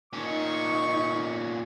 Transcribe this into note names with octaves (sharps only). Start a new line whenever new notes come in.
A#2 C#4 D#4 C#6